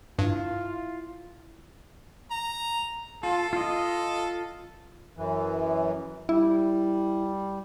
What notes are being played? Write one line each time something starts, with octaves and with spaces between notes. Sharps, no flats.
G2 E4 F4
A#5
F4 A4
F4 D#5
F#2 E3
G3 E4